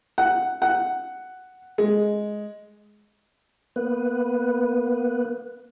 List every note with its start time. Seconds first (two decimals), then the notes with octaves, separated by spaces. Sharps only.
0.18 F#5
0.62 F#5
1.78 G#3
3.76 A#3 B3 B4